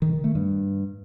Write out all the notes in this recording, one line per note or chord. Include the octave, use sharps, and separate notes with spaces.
D#3
D#3
A3
G2